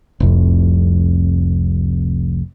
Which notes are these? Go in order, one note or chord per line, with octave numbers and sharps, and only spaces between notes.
F1 C2 F2